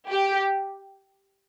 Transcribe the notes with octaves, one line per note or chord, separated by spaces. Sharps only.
G4